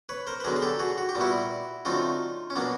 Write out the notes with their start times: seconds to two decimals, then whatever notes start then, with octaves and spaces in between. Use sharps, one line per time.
0.09 B4 C#5
0.27 A#4 C5
0.40 B4
0.44 D3 F#3 B3 G#4 A#4
0.56 G#4
0.62 G4 A4
0.79 F#4 G#4
0.98 F#4
1.09 G4
1.15 A#2 G3 B3
1.21 E4 F#4
1.85 D3 F#3 A3 C4 D#4 F4
2.50 C#4
2.56 B2 F#3 A#3 D4